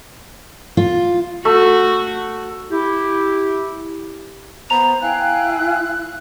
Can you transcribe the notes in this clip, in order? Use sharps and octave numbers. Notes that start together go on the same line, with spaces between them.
F4
A3 F#4
E4 G4
B3 C5 A#5 F7
E4 F5 G5 G#5 F#6